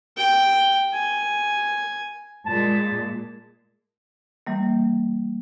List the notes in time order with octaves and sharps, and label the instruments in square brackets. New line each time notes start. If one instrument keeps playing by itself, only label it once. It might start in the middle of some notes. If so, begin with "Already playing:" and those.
[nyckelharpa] G5
G#5
[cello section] A#2 G#3 [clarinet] A5
[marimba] E3 G3 A#3